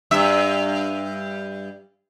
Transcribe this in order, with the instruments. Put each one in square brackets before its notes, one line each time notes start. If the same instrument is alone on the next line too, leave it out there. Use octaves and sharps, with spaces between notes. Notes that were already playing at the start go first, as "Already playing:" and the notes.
[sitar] G2 E5